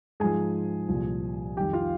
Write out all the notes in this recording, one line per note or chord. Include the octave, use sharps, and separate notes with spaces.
G#2 F3 G#4 G#5
C2 A#2 F3
F2 D#3 G3 G4 G5
F4 F5